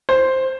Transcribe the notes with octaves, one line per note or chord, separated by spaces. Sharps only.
C5